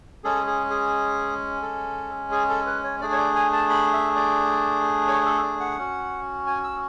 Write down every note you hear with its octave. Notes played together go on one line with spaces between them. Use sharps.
G#3 C#4 G#4 A4
G#4
G#4
A4
G#4
A4
B4
C#5
A3 D4 G#4 D5
C#5
D5
G#5
A5
B5
E5
D5
C#5
A4
D5
F#5
C#4 F#4
G#5
E6